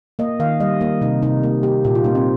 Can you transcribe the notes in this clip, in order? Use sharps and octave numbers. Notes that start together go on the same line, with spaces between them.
A#3 D#5
D#3 F5
G3 D#5
A#3 D#4
C3 D#4
C3 D#4
A#3
A#3 G4
A#2 G4
F4
A#3 D#4
C4